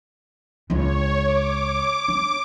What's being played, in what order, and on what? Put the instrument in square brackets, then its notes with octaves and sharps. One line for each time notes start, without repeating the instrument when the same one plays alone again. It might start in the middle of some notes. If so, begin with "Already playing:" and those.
[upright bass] C#2 D4 [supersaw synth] C#5
[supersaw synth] D6
[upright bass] D4